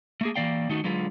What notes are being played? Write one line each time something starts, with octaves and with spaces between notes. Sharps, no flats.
A3 A#3 G#4
E3 G#3 A#3 D5 F5 G5
D#3 A3 D#4 F#4
D3 F#3 G#3 F4 B4